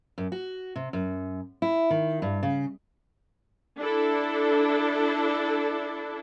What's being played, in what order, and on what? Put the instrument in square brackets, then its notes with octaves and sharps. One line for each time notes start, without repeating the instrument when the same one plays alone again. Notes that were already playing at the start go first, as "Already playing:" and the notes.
[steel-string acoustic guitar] F#2
F#4
C3
F#2
E4
D#3
G2
C#3
[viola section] D4 E4 A4